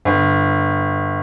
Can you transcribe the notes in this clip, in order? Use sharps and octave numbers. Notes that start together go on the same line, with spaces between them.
G1